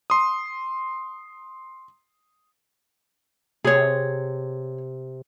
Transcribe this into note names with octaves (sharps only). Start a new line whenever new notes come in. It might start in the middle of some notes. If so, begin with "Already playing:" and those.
C6 D#6
C3 G#4 C#5